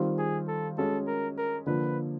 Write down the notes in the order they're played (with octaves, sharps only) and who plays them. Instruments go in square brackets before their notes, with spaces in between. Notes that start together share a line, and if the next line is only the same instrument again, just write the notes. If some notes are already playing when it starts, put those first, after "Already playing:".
Already playing: [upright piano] D#3 G3 C4 F4
[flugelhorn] G#4
A4
[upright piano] G#3 C#4 F#4 [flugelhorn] A4
[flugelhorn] A#4
A#4
[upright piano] D3 F3 A#3 [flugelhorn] B4